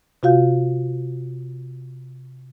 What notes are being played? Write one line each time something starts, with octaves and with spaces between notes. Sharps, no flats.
C3 F4 F#4 F5 G6